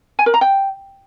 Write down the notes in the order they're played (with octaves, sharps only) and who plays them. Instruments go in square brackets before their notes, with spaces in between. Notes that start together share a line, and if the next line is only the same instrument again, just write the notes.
[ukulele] G#5
A#4
A#5
G5